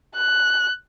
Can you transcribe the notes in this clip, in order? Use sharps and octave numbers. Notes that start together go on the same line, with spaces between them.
F#6